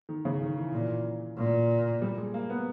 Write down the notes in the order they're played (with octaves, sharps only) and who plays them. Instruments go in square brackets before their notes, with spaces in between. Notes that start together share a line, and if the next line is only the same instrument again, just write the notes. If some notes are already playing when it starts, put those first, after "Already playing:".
[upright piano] D#3
C#3
D#3
E3
[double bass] A#2
A#2
[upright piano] G3
G#3
A#3
B3